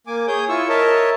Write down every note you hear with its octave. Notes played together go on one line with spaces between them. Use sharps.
A#3 G#5 D6
G#4 C#5 G#5 D#6 G6
E4 F4 C#6 E6
A#4 C#5 D#5 E5 A5